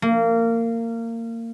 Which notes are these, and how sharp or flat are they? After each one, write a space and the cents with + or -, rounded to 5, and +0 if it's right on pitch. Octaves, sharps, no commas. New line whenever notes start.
A#3 -25